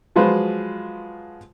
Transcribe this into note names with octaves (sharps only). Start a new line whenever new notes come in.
F3 F#3 G#3 F4 B4 C5